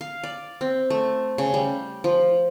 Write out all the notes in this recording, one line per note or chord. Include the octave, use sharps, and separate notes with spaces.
F5
D5
C4
A3
C#3
G3
F3